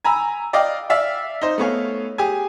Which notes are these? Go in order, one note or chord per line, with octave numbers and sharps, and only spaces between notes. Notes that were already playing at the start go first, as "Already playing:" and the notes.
G#5 A#5 B5 E6
D5 D#5 F5 G5 D6
D5 E5 F5
D#4 C5
A3 B3 C#5 F5
G4 G#4 G#5